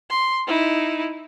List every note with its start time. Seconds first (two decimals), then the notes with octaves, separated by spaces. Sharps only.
0.10 C6
0.48 D#4 E4